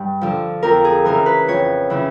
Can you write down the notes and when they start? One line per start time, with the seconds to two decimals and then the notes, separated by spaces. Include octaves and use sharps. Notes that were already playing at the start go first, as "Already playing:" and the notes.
Already playing: G2
0.21 D3 F3
0.63 F2 A#4
0.84 G#4
1.05 C#3 E3 A#4
1.26 B4
1.48 F2 C#5
1.90 C#3 E3